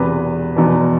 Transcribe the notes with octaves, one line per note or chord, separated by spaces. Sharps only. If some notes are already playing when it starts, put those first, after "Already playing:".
Already playing: E1 E2 C3 B4
F1 E2 B2